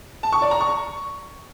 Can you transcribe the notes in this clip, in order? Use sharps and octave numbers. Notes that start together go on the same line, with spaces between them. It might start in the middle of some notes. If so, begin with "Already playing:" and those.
A5
C#6
D5
A#5
C#6